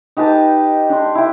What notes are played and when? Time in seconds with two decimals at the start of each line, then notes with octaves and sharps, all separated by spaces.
0.17 D#4 G4 B4 A5
0.89 D4 C6
1.15 E4 G5